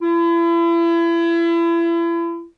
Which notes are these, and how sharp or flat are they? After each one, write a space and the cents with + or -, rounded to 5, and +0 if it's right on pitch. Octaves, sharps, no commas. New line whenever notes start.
E4 +35